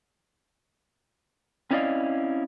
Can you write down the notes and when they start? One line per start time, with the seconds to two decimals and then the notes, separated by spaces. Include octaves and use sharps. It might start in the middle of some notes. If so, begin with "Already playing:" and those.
1.71 C4 C#4 E4 D5 D#5 F5